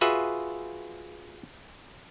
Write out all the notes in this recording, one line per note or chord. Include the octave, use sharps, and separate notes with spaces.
F4 F#4 G#4 B4 E5